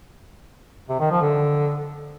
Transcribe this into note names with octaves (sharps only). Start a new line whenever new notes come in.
C3
D#3
F3
D3